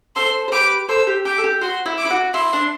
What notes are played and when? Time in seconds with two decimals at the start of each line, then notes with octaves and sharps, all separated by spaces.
0.16 A4 C5 C6
0.48 C5
0.52 G4 B4 D6
0.89 A4 C5 E6
1.07 G4
1.25 G4 D6
1.38 A4
1.44 G4
1.61 F#4 C6
1.86 E4
1.98 D6
2.05 E4
2.10 F#4
2.34 E4 C6
2.53 D4